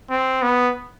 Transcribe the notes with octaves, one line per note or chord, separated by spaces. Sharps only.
C4
B3